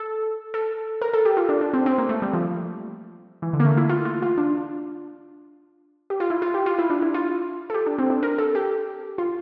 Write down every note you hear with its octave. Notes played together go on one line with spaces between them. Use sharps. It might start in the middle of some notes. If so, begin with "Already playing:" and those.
Already playing: A4
A4
A#4
A4
G4
F4
D4
D4
C4
C4
A#3
A3
G3
F3
E3
D3
A#3
A3
E4
F4
F4
F4
D4
G4
F4
E4
F4
G4
F4
E4
D4
E4
F4
A4
G4
D4
C4
D4
A#4
A4
G4
F4